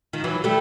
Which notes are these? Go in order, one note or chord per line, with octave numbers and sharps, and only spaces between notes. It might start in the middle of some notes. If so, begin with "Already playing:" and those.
D#3 F3
E3 F#3
G3 A3